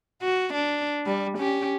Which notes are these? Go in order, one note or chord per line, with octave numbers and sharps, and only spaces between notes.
F#4
D4
G3
C#4 G4